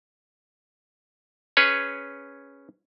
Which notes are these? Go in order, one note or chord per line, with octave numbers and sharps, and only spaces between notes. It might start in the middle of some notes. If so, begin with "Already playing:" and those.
C#4 G#4 B4 C#5